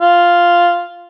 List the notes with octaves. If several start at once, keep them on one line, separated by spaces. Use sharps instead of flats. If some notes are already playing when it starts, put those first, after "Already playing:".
F4